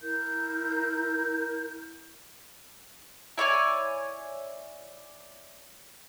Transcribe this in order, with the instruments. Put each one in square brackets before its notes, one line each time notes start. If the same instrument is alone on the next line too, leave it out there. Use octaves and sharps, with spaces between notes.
[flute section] E4 A#4 G6
[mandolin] E4 C#5 D5 G#5